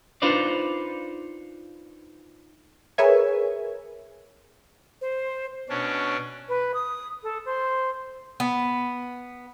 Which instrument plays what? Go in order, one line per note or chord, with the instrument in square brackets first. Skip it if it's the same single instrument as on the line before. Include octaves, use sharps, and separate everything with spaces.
[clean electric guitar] D4 D#4 F4 B4 C5 D5
[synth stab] G#4 A#4 B4 C#5 E5 G#5
[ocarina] C5
[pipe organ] B2 C#4 D4
[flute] B4
D#6
A4
C5
[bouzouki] B3